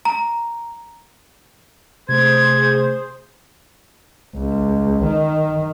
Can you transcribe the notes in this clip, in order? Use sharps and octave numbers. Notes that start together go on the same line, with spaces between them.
A#5
C3 A3 G#4 C5 G#6
C#2
D#3